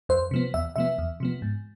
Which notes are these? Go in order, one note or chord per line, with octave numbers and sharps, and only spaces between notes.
F2 C5
C3 F3 B3
E2 E5
C3 F3 B3 E5
E2
C3 F3 B3
G#2